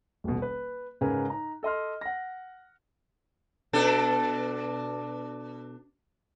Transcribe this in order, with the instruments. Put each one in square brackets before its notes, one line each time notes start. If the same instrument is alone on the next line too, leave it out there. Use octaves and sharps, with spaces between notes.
[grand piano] D#1 A1 B2
B4
G#2 C#3 A#4 B4 G#5
D#4 A#5
A4 D#5 C6 F6
F#5 A#6
[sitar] B2 D4 A4